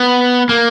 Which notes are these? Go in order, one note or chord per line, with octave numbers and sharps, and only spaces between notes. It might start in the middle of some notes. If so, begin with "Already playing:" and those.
Already playing: B3
A#3